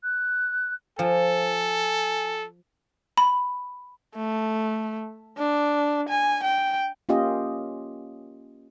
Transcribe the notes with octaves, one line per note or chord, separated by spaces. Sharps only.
F#6
F3 A4 G#5
B5
A3
D4
G#5
G5
A#3 C#4 F4 G4 D#5